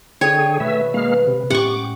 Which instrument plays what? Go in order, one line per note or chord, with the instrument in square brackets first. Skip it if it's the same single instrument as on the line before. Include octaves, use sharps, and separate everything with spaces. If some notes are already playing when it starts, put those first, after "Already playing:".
[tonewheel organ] D3 G#4 [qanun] C#5 [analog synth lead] G5
[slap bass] B2 D#3 [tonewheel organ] A3 E5 [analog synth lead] B4
[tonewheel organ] G#3 A#3 F5
C3
[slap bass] A2 G#3 C#4 [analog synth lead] G4 [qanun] F#5 C#6 [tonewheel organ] D6